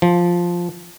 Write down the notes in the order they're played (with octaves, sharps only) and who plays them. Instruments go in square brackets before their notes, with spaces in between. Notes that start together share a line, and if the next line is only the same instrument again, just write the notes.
[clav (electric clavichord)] F3